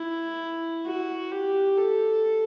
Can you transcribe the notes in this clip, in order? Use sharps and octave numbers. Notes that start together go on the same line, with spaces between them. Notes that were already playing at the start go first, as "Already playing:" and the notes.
Already playing: E4
F#4
G4
A4